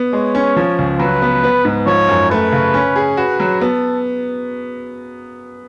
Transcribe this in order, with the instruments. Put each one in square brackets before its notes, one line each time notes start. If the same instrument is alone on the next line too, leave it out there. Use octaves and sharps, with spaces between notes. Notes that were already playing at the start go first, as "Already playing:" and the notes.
Already playing: [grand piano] B3
[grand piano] G#3 [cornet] C#5
[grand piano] C#4
F3
C#2
[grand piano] F#3 [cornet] B4
[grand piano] B3
B3
G#2
[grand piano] F3 [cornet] C#5
[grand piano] F#2
[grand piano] A3 [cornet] B4
[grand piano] C#3
C#4
G#4
[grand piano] F#4 [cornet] B4
[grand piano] F#3
[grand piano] B3 [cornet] A4